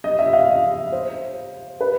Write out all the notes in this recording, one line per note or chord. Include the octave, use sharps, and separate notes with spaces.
D#5
E5
F5
C5
B4